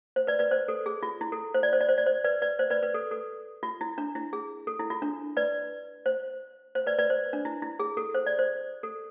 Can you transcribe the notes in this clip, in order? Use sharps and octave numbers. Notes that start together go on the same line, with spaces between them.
C5
B4 D5
B4 D5
C5
A4
G#4
F4
E4
A4
C5
D5
C5
D5
C5
D5
C5
B4 D5
B4 D5
C5
B4 D5
B4
A4
A4
F4
E4
D4
E4
G#4
A4
E4
F4
D4
B4 D5
C5
C5
B4 D5
B4 D5
C5
D4
E4
E4
G#4
A4
C5
D5
C5
A4